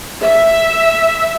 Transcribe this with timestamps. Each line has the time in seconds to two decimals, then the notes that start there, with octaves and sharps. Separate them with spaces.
0.23 E5